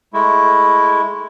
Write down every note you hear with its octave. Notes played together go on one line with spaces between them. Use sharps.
G#3 A3 E4